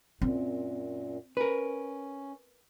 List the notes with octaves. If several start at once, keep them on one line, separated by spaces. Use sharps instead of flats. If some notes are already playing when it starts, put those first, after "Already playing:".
F#2 A#2 C4
C#4 A#4 B4